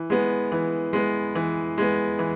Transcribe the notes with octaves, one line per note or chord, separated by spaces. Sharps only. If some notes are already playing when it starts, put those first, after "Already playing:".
Already playing: E3
G#3 B3
E3
G#3 B3
E3
G#3 B3
E3